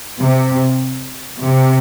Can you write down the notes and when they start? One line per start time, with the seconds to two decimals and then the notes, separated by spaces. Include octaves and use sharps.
0.20 C3
1.41 C3